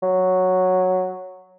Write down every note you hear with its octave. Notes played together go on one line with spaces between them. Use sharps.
F#3